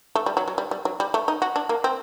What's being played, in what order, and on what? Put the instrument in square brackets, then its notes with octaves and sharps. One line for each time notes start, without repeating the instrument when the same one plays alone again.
[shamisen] A3
G3
F#3
F#3
G3
G3
F#3
G3
A3
D#4
F#4
D4
A#3
C4